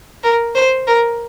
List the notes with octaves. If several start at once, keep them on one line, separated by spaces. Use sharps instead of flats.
A#4
C5
A#4